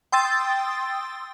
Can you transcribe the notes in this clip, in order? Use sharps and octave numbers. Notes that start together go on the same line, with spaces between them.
G5 C6 D#6 E6 A6